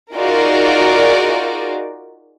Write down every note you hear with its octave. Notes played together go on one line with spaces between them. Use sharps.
D#4 F4 F#4 G#4 A#4 D5